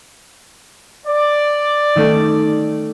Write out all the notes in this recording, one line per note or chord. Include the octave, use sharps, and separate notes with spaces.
D5
D#3 A3 C#4